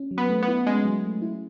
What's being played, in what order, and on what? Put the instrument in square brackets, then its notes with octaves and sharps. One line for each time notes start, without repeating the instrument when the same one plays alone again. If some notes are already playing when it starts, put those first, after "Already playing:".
Already playing: [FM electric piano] C#4
F#3
[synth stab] B3
[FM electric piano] A3
[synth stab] B3
[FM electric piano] E4
[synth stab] G#3 [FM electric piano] C#4
[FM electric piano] F#3
A3
E4